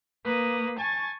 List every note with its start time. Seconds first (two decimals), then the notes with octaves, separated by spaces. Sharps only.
0.24 A#3 B4 D#6
0.79 G#5 A5 C#6 A6